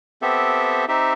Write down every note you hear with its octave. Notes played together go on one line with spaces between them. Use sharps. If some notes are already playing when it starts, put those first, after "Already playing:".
B3 C4 G4 A4 E5
C4 D#4 G4 E5